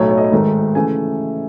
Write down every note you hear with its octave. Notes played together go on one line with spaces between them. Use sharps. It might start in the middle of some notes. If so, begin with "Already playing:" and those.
Already playing: B1 A2 F#3 A3 C#5
C#5
D#5
C#5
G#1 G#2 D#3 A3
C#3 E3 A3 G#5